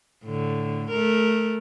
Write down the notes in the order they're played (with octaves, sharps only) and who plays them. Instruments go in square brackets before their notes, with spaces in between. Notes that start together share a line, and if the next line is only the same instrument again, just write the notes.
[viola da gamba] A2 D3
A3 A#4